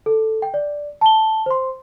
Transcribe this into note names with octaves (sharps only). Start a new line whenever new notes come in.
A4
G5
D5
A5 G7
C5 C6